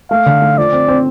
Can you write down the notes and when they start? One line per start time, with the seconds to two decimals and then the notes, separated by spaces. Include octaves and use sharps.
0.11 A3 F5
0.26 D3
0.42 A3
0.57 F3 D5
0.73 C4
0.88 C4